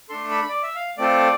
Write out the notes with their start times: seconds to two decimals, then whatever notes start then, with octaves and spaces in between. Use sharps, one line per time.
0.09 A3 D4 A4 C6
0.31 B5
0.49 D5
0.63 E5
0.75 F5
0.98 A3 C4 F4 A4 D5